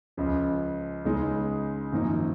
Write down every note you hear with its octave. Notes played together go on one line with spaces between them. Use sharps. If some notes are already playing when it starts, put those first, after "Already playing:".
C#2 C#3 F3
C#2 C#3 G#3 D#4
G#1 F#2 F3 A#3 D#4